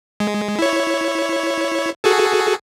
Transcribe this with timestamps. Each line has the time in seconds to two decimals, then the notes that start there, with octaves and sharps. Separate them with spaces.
0.20 G#3
0.59 E4 C#5
2.04 F#4 G#4 A4